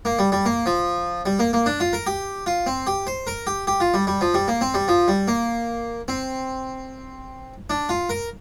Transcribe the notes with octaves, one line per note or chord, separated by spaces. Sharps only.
A#3
G3
G3
A#3
F3
G3
A#3
A#3
D4
F4
A#4
G4
F4
C4
G4
C5
A#4
G4
G4
F4
G3
G3
F3
G3
A#3
C4
G3
F3
G3
A#3
C4
D4
F4
A#4